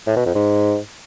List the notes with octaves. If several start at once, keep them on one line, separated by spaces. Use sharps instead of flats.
A2
B2
F2
G#2